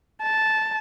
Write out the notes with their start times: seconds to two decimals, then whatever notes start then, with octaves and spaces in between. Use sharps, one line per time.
0.22 A5